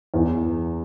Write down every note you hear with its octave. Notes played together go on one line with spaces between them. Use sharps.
E2